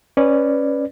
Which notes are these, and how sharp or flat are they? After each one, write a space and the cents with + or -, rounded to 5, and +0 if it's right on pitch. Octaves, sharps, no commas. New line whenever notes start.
C#4 -5 B4 +0 D5 +10